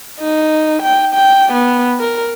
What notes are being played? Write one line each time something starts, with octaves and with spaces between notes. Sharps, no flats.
D#4
G5
G5
B3
A#4